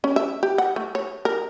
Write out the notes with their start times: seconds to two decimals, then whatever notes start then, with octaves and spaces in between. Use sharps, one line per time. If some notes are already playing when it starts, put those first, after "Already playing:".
0.04 C#4
0.16 E5
0.43 G4
0.58 F#5
0.76 A3
0.95 C#5
1.25 A#4